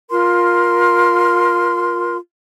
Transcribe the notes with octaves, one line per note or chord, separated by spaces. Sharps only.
F4 A#4 C6